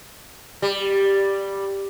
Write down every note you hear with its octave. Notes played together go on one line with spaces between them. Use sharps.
G3